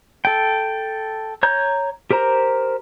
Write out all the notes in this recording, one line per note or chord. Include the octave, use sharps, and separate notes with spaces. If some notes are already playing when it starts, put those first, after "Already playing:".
A4 G5
C#5 A#5 G6
G4 A#4 C5 A#5